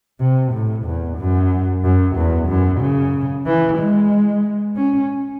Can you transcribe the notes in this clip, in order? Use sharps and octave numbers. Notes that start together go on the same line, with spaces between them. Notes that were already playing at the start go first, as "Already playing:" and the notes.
C3
A2
E2
F#2
F#2
E2
F#2
C#3
E3
G#3
C#4